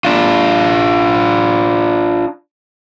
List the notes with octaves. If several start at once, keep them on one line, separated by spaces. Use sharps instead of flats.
D4 F4